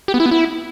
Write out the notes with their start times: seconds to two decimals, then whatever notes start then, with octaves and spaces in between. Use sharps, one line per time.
0.08 G4
0.14 B3
0.20 E4
0.26 B3
0.31 E4